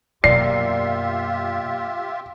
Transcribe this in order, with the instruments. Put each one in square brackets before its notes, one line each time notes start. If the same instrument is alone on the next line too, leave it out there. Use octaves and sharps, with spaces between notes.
[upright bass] F#2 B2 [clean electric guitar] A#3 D5 [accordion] F4 G4 E5 [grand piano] C7